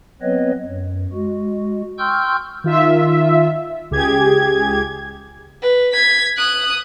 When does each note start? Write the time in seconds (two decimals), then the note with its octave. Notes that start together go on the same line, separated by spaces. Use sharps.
0.22 F#3 B3 C4 B4 C#5 D#5
0.65 F#2
1.13 G#3 F#4
1.99 G5 C6 C#6 E6 F6 G6
2.64 D#3 F4 E5
3.91 C#2 G4 G#4 G#6
5.62 B4
5.92 G#6 B6
6.37 D#6 F#6